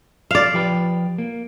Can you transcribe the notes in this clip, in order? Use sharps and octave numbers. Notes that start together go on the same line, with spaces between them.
D5 F5
F3 G4 B4
A#3